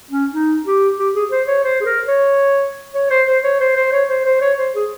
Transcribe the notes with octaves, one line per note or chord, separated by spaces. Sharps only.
C#4
D#4
G4
G4
G#4
C5
C#5
C5
G#4
A#4
C#5
C#5
C5
C5
C#5
C5
C5
C#5
C5
C5
C#5
C5
G#4